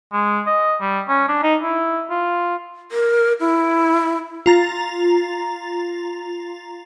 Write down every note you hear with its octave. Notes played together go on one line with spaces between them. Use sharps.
G#3
D#5
G3
C#4
D4
D#4
E4
F4
A#4
E4
F4 A#5 A6